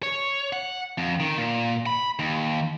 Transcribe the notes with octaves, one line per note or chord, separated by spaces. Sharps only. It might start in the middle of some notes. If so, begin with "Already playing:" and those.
C#5
F#5
F2
D#3
A#2
B5
D#2